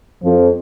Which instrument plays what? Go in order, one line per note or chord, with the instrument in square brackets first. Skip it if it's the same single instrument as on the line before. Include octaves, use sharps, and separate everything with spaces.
[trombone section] F2 F3